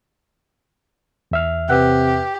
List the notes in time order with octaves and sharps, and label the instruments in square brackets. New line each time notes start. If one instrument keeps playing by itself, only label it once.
[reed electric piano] E2 E5 F6
[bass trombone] C3 [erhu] G4 [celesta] B4 F#5 F#6